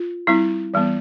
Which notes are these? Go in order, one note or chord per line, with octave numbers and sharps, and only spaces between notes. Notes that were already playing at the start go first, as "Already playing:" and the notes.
Already playing: F4
G3 C4 E4
E3 G3 B3